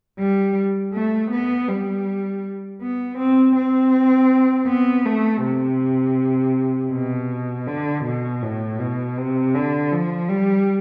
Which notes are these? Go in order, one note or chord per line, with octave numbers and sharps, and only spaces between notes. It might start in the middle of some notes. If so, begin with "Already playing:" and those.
G3
A3
B3
G3
B3
C4
C4
B3
A3
C3
B2
D3
B2
A2
B2
C3
D3
F3
G3